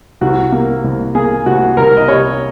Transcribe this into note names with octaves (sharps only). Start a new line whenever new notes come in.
C2 F#4
A#3
C2
A#3 G#4
C2 F#4
C2 A#4
D#5
C3 C#5